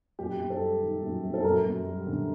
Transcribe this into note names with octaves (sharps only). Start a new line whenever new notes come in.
F#2 G4
F#2
A4
G3
D#3
F#2
F#2
A4
F#2 A#4
F#2
G3
D3